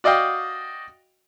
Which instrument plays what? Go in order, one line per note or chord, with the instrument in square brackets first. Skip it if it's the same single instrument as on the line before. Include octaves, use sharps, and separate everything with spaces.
[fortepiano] F#4 D5 D#5 F5 G5